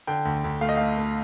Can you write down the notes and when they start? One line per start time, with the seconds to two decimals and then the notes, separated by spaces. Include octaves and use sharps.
0.07 D3 G5
0.25 D2
0.44 D2
0.61 A3 F5
0.69 D#5
0.77 A3 F5
0.98 A3